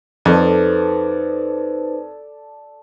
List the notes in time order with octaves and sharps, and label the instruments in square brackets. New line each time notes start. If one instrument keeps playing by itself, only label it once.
[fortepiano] F2 [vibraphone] D#4 B4 C5 [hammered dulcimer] A4 D5